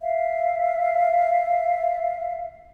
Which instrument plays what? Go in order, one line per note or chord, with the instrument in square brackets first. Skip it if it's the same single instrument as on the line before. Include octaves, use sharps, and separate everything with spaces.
[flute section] E5 F5